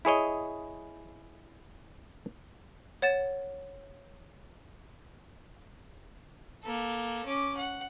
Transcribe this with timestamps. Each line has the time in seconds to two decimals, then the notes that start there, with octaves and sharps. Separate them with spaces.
0.05 E4 G#4 C#5 D#5
3.02 C#5 F#5 A6 E7
6.63 A#3 A4
7.26 C#4 D6
7.57 F#5